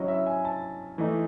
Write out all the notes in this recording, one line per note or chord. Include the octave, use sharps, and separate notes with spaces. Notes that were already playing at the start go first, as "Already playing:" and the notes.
Already playing: F#3 C#4 E4 D#5
E5
G#5
A5
E3 A3 D#4